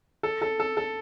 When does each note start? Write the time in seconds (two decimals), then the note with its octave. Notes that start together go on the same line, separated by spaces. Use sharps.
0.23 A4
0.42 A4
0.60 A4
0.77 A4